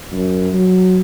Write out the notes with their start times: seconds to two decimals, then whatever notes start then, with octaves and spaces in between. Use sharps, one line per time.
0.12 F#2
0.53 F#3